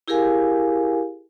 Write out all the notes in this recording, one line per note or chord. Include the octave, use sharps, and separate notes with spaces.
E4 G4 G#4 A#4 F5 G#5